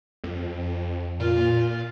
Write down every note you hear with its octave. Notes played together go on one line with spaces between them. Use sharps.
F2
A#2 F4